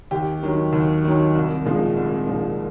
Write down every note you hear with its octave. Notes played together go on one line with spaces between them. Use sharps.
D#2 G4
D#3 F#3
D#2
D#3 F#3
C2
A#2 F3 G#3
C2
A#2 F3 G#3